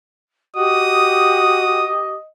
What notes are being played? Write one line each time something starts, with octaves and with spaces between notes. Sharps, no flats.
F#4 G4 D#5 D#6